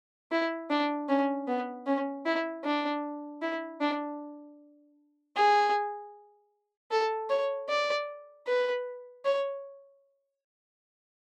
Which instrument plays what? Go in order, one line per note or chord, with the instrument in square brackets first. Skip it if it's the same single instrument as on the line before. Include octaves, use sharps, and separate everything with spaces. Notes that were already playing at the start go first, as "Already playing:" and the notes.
[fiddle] E4
D4
C#4
B3
C#4
E4
D4
E4
D4
G#4
A4
C#5
D5
B4
C#5